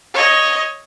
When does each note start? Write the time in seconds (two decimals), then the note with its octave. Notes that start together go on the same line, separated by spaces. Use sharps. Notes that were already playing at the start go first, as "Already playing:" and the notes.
0.14 C#5 D#5